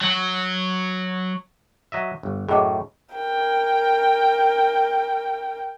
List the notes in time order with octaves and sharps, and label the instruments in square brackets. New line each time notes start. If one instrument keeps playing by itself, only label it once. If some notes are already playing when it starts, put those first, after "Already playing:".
[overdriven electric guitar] F#3
[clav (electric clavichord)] F#3 D#5 E5
G1
[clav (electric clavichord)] F#2 A2 [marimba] G#4 D#5 D6
[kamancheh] A#4 G5